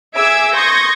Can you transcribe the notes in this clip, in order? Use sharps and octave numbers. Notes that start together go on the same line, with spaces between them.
G#4 E5 D6 E6 G#6 D7
C6 C#6 D#6 G6 G#6 A#6